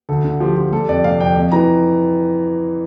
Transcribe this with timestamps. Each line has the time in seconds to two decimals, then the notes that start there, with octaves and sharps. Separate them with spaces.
0.09 D2 A4
0.24 D3
0.40 F3 G4
0.57 F3
0.72 G3 A4
0.88 F2 D5
1.04 C3 F5
1.20 F2 G5
1.36 F2
1.52 E3 A#5